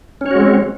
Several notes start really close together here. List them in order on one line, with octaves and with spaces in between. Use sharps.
C#4 C#5 F#4 G#3 C4